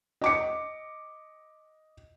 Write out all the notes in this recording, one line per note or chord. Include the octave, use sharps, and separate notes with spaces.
D#5 D6 C#7